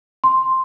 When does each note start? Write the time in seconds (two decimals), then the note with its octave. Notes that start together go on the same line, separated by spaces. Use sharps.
0.24 C6